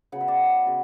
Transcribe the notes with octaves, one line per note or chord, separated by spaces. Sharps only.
C#3 F#3 B3 F#5
E5
D5 F#5
C#3 F#3 B3